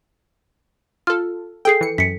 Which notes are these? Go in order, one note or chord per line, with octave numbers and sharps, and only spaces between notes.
F4 A4 F6
G#4 A4 G5 C7
E3 C#7
F#2 B6 C#7